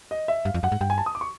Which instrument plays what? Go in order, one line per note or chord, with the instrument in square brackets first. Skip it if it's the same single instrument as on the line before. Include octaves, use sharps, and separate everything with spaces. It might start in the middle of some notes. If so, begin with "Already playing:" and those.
[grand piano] D#5
E5
[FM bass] G2 [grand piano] F5
[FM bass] F2
[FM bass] F#2 [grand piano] F#5
[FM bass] G#2
[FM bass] G2 [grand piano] G5
[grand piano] G#5
A5
D#6
D6
C#6